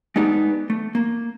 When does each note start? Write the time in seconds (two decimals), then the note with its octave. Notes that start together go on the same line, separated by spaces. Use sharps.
0.16 G#3 A3 B3 D4 D#4 G4
0.70 A3
0.95 A#3